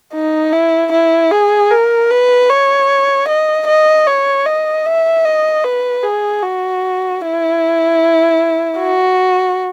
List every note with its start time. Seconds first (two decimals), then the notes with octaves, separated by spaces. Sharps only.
0.13 D#4
0.53 E4
0.92 E4
1.31 G#4
1.71 A#4
2.11 B4
2.49 C#5
3.28 D#5
3.67 D#5
4.07 C#5
4.46 D#5
4.86 E5
5.25 D#5
5.64 B4
6.03 G#4
6.43 F#4
7.21 E4
8.79 F#4